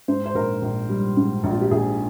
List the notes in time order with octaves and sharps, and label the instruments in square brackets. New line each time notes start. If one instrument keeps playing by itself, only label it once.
[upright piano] G#2 C5
C5
A#1 A#4
A#1
G3
G#2
A#1
F4
G4
A#1 G#4